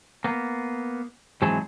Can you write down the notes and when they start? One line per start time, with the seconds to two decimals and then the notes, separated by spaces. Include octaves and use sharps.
0.24 A#3 B3
1.42 G#2 E3 F#3 C4 G#4 A5